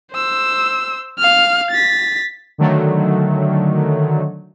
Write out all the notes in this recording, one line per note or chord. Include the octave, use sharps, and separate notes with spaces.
C5 E6
F5 F6
A6 B6
D3 D#3 F#3 A3